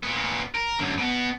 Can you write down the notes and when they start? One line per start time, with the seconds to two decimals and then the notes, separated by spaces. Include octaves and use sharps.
0.03 A#2 B3
0.55 A#4
0.79 F#2 D3
0.98 B2 B3